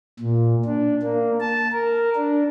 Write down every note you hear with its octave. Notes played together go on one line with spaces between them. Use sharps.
A#2
D4
A#3
A5
A#4
D4